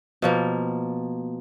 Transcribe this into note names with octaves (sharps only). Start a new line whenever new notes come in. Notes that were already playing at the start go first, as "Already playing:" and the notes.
B2 F3 A#3